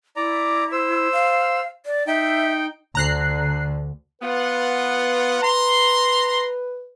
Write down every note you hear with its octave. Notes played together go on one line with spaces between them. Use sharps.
E4 D5 A#5
C5 E6
F5
D5
D#4 E5 G5
D2 D3 A#5 F#6 C7
B3 F4 B4 F#5
A#5 C6